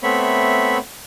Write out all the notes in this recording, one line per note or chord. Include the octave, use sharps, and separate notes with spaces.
A3 B3 C4 C#5 E5 B5